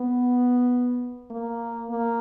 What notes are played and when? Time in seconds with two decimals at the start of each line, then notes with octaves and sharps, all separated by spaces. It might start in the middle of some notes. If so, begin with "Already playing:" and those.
Already playing: B3
1.30 A#3
1.90 A#3